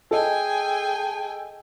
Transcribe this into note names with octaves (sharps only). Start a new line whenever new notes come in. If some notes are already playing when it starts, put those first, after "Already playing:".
G#4 A4 D#5 G5 G#5